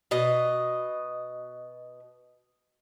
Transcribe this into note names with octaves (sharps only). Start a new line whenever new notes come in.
B2 D#5